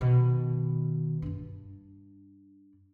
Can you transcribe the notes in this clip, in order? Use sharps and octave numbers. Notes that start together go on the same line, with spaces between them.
B2 D#3
G2 D4